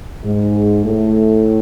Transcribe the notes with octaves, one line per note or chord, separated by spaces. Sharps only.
G#2 G#3
A2 A3